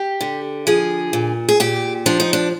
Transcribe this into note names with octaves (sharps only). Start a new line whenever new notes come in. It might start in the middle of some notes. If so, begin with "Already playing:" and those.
Already playing: G4
D3
F3 G#4
A#2
G#4
A#2 G4
F3 D4
D#4
D4